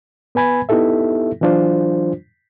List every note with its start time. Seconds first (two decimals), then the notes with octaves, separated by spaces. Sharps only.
0.35 B3 B4 G#5 B5 G#6
0.69 B3 D#4 E4 G4 A4 E5
1.41 E3 F#3 D4 F4 C5